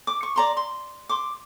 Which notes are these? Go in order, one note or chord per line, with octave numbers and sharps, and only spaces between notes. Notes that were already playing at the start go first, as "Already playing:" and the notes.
D6
C#6
D5 A#5 C6
C6
C6 D6